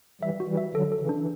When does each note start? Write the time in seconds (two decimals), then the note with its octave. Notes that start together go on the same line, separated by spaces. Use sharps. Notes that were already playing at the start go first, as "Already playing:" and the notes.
0.22 E3 G3 E5
0.40 F#4
0.48 E3 G3
0.57 E5
0.75 D3 F#3 A4
0.92 A4
1.00 C#3 E3
1.09 D4
1.19 E3